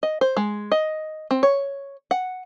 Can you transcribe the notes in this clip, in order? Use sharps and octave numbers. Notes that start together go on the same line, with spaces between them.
D#5
C5
G#3
D#5
C4
C#5
F#5